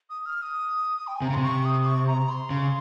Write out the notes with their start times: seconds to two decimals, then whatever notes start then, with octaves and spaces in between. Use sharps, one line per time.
0.10 D#6
0.26 F6
0.42 D#6
1.07 G5
1.16 G#5
1.22 C3
1.25 A#5
1.30 C#3
1.34 C3 C6
1.43 C#6
1.65 D#6
1.86 C#6
2.07 A#5
2.29 C6
2.50 C#3